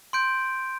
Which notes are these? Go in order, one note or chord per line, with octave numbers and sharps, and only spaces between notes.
C6 G6 D7